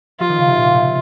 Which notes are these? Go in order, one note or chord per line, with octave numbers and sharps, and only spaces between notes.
F3 F4
D#3
C#3
C3
A#2
C3